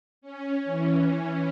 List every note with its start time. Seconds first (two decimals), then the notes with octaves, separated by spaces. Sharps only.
0.22 C#4
0.65 E3